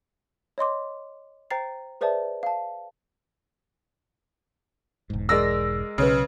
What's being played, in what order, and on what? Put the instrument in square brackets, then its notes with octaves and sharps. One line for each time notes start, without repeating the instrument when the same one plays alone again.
[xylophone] C#5 D#5 C6 D6
C5 G5 A#5 A6 C7
G#4 B4 C5 D5 E5 A5
F5 A5
[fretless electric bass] E1 G#2
[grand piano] G#3 A#4 D5 [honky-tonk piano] E6 A#6
[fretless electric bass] B1 [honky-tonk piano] C#3 [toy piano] B4 C#5 G#5